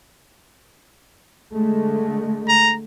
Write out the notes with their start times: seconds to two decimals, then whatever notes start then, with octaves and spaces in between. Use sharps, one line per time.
1.52 D3 G#3 A3
2.49 A#5